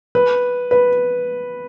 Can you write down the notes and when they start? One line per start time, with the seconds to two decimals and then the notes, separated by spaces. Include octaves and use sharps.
0.15 B4
0.71 B4